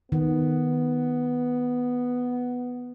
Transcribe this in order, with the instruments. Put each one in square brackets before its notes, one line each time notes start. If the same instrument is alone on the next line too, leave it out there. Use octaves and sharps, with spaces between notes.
[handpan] D#3 [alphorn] B3